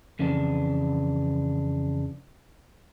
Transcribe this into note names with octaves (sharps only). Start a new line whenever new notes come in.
F2 C#3 E3 C4 D4